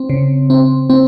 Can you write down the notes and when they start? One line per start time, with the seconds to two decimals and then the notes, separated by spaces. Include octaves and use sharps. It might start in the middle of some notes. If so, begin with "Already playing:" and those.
Already playing: C4
0.10 C#3
0.50 C4
0.90 C4